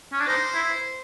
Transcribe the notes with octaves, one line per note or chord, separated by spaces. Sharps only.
C#4
D4
D#4 C5
E4